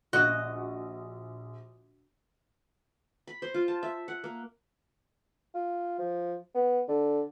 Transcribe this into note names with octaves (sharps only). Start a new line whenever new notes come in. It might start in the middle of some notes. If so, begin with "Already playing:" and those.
A#1 F#4 D#5
B5
C5
F4
A5
E5
F#5
A#3
F4
F3
B3
D3